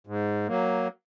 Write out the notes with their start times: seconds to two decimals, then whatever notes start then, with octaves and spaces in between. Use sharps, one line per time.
0.07 G#2
0.47 F#3 A#3